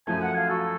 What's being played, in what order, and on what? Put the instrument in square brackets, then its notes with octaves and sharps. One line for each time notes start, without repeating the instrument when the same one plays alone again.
[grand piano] F#2 F3 A3 [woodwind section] G#5
[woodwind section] F#5
F5 G#5
F#4 A4